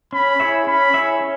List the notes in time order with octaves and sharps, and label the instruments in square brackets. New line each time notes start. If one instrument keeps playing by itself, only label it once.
[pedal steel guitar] C#4 [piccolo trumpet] B5
[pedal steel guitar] E4 G#4 C#5 E5
[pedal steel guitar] C#4 [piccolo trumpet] B5
[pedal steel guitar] E4 G#4 C#5 E5
C#4